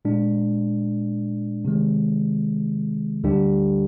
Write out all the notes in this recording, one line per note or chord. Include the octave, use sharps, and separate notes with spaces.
A#2 G#3 D4
C3 D#3 G#3
D2 D3 G3 D4 G4